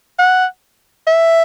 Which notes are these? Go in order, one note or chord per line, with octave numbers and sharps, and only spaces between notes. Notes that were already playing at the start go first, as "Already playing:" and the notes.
F#5
E5